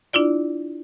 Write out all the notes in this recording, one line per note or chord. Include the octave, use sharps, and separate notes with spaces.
D4 E4 F4 D5